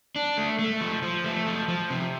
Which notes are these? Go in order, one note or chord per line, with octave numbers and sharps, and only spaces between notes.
D4
A3
A3
F3
F3
A3
F3
F3
C3